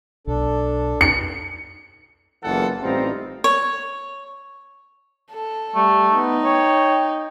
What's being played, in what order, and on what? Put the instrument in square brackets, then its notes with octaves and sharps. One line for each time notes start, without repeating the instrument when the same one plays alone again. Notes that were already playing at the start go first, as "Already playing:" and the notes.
[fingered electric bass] B1 [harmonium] D4 A4
[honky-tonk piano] C#7
[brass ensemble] F#1 E2 E3 F4 A4 F#5
A1 G3 C4 D#4 F4 A#5
[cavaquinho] C#5
[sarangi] A4
[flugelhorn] G3 [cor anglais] A3
[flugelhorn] B3 [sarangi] D#4
[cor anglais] C#5 [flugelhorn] G5